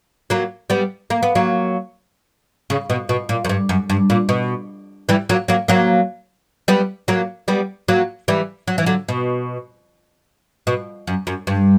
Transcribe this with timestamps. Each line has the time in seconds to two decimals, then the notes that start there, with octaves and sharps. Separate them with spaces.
0.30 F#3 A#3
0.70 G3 B3
1.10 A#3
1.23 B3
1.35 F#3 A#3
2.70 C#3
2.90 B2
3.09 B2
3.29 A#2
3.45 F#2
3.49 G2
3.69 F#2
3.90 G2
4.10 A#2
4.29 B2
5.09 E3 G3
5.29 F#3 A#3
5.48 F#3 A#3
5.68 F#3 A#3
6.68 G3 B3
7.08 F#3 A#3
7.48 G3 B3
7.88 F#3 A#3
8.28 E3 G3
8.67 F#3
8.78 E3
8.86 D3 F#3
9.09 B2
10.67 B2
11.07 F#2
11.27 F#2
11.47 G2